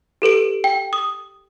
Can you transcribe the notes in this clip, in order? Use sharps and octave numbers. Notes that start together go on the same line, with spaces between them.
G4 A4 B4 D7
G5
D#6